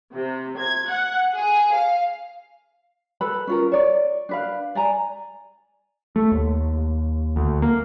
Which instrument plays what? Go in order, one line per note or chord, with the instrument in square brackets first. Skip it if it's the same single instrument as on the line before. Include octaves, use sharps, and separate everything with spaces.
[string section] C3
G#6
F#5
G#4
F5
[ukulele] A4 B4 B5
C#4 F4 A#4
C#5 D5
D4 B4 F5
D5 G#5 A#5
[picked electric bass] A3
D#2
D2
A#3